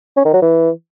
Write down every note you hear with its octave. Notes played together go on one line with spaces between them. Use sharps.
C#4
D#3
F#3
E3